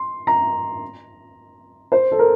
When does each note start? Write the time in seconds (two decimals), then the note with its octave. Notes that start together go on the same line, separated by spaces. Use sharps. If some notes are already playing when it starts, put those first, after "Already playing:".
Already playing: C6
0.27 A#5
1.92 C5
2.12 A4
2.19 A#4